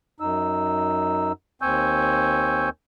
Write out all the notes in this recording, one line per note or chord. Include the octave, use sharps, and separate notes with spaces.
F#2 D#4 E6
D#2 C4 G#5 C#6 E6 G6